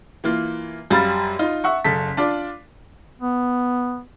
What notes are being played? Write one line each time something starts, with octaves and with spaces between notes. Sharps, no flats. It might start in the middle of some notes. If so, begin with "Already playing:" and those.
E3 A#3 F4
F#2 G3 F5 B5 A6
D#4 F4
E5 F#5 C#6
F#1 C#3 A4 B6
D4 F4 D5
B3